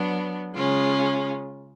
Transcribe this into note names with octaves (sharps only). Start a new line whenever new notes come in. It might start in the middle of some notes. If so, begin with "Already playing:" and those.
Already playing: F#3 B3 D4
C#3 G#3 C#4 F4